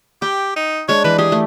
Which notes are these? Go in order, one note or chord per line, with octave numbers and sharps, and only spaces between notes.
G4 G5
D#4
G#3 D4 C#5
E3 B4
G4 G#4
A3